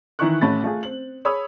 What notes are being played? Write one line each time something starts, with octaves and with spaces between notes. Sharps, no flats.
D#3 E3 E4 A#5 C#6 F#6
A1 A3 C#4 B5 A6
A3 F4 G#4
C4 F#7
G#4 C#5 B5 D#6 E6